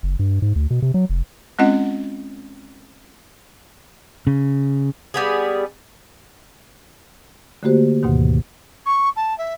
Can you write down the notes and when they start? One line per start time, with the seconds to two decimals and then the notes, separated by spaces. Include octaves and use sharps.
0.03 F#1
0.19 G2
0.42 G#2
0.56 D2
0.70 B2
0.82 C3
0.94 F#3
1.10 F1
1.59 G#3 C4 C#4 F4 D#5 F#5
4.27 C#3
5.14 G3 B3 G#4
7.63 D3 A3 A#3 F#4 G4 C5
8.03 D2 G#2 B2 D#3
8.85 C#6
9.16 A5
9.38 E5